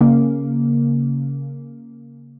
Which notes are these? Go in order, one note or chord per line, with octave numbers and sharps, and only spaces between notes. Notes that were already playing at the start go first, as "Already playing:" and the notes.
C#3 A#3